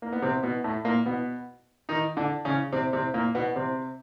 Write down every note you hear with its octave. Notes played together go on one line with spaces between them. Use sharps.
A#3
B3
C3 C4
B2 B3
A2 A3
A#2 A#3
B2 B3
D#3 D#4
D3 D4
C#3 C#4
C3 C4
C3 C4
A#2 A#3
B2 B3
C3 C4